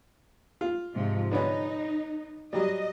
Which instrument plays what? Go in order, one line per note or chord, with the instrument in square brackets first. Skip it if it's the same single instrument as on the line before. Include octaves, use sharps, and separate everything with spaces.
[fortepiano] F4
[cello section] G#2 C3 F3
[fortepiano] D3 B3 C#4 [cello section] D#4
[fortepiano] F#3 G3 [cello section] D#5